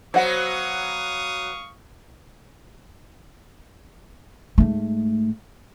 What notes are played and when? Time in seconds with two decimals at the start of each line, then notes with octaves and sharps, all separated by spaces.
0.14 F#3 B3 C5 F5 F#5 C#6 D#6
4.58 G#2 A3